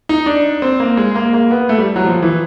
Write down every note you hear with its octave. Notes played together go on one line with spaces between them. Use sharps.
D#4
D4
C4
A#3
G#3
A#3
A#3
B3
A3
G3
F#3
F3
E3